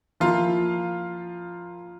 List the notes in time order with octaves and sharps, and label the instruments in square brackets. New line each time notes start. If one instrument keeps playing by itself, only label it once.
[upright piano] F3 A#3 E4 [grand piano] F4 F5